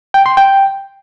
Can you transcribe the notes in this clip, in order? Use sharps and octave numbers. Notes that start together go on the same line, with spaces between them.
G5
C6
G5